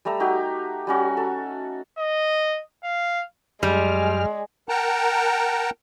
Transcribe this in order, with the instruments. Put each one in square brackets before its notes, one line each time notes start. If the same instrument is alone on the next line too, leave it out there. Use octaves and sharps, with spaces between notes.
[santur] G3 A3 A#5 E6
D#4 F#4 G4
G3 C#4 F#4
A4
[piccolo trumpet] D#5
F5
[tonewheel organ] F#2 F6 [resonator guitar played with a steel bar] G3 [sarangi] G#3
[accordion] A#4 F#5 G5 A5 A#5